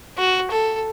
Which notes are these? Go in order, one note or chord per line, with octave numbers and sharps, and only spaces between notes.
F#4
A4